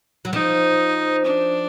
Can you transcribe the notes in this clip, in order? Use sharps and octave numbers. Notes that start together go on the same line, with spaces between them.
F#3
F3 D#4
D4